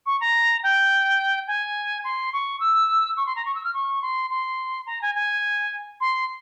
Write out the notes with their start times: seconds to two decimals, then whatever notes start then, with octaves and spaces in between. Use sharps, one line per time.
0.06 C#6
0.20 A#5
0.63 G5
1.47 G#5
2.04 C6
2.33 C#6
2.60 E6
3.17 C#6
3.26 C6
3.36 A#5
3.45 C#6
3.55 E6
3.64 F6
3.73 C#6
4.02 C6
4.30 C6
4.86 A#5
5.01 G#5
5.14 G#5
6.00 C6